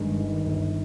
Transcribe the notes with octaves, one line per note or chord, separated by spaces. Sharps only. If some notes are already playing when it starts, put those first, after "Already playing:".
Already playing: G1 G2 D#3 G#3
D#3
G1